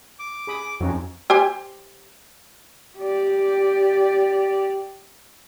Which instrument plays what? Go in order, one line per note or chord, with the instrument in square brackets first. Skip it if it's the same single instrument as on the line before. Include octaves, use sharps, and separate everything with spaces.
[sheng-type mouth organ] D6
[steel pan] G#4 B5 D#6
[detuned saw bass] F2 [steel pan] C#4 D#4 F#4
[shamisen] G4 C5 G#5
[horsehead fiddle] G4 D5